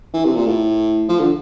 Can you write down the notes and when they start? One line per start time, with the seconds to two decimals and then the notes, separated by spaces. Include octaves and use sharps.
0.14 E3
0.25 C3
0.36 A#2
0.46 A2
1.09 F3
1.19 D3